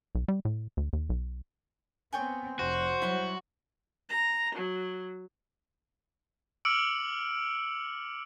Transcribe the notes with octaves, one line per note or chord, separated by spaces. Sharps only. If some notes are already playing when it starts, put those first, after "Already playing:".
B1
G3
A2
D2
D#2
B1
B3 C4 C#5 G5 G#5
F1 F#4 C5
F#3 G3 E4 F#5 C6
A#5
F#3
D6 E6 F6 C#7 D7 F#7